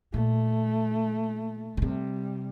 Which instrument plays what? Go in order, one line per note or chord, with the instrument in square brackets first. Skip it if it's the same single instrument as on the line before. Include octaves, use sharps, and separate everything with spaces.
[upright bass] A#2 [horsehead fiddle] A3
[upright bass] A#2
[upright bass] C3 [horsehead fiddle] G3